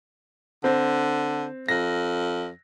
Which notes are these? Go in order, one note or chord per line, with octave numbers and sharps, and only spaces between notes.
D3 C4
F2 A#6